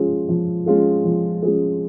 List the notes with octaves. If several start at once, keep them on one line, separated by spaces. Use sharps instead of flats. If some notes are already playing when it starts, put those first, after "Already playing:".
Already playing: F3 G#3 C#4 F4 G#4
F3
G#3 C#4 F4 G#4
F3
G#3 C#4 F4 G#4